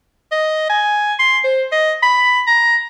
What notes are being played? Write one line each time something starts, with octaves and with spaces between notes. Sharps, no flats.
D#5
G#5
C6
C5
D#5
B5
A#5